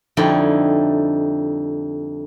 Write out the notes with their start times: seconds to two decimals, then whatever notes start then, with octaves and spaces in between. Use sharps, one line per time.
0.17 F2 D3 G3 D#4 E4